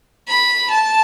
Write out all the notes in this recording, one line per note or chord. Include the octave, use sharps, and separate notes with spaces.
B5
A5